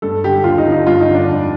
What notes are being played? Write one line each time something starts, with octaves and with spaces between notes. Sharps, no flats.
G2 A4
D3 G4
D#2 F4
D#4
D3
D#4
G2 F4
D#4
D3
D4
F2